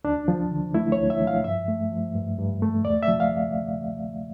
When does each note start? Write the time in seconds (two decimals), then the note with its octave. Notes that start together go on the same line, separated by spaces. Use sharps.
0.04 D2 D4
0.28 F3
0.51 D3
0.74 A3 E4
0.92 C#5
0.98 D2
1.10 E5
1.21 F3
1.27 F5
1.44 G2 E5
1.68 A3
1.92 F3
2.15 G2
2.38 G2
2.62 A3
2.85 E2 D5
3.03 E5
3.08 F3
3.20 F5